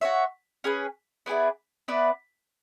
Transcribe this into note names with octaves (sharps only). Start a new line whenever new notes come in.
F#4 C#5 E5
C#4 G#4 B4
B3 E4 G#4 D5
B3 E4 B4 D5